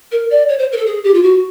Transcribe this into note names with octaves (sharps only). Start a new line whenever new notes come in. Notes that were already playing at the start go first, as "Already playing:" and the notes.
A#4
D5
C#5
C5
A#4
A4
G#4
G4
F4
F#4